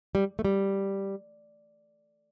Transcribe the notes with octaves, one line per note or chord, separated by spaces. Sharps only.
G3
A3
G3